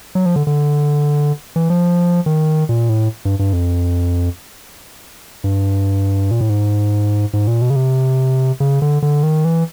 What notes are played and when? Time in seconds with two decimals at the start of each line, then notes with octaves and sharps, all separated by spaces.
0.15 F#3
0.26 F3
0.36 D3
0.47 D3
1.56 E3
1.70 F3
2.26 D#3
2.69 A#2
2.89 A2
3.25 G2
3.39 G2
3.53 F2
5.44 G2
6.31 A#2
6.41 A2
6.50 G#2
7.33 G#2
7.47 A#2
7.62 B2
7.70 C#3
7.76 C3
8.60 C#3
8.82 D3
9.02 D3
9.23 D#3
9.45 E3